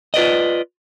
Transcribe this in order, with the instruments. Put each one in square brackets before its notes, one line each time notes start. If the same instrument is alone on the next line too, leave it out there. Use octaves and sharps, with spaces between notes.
[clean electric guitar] F4 B4 D5 D#5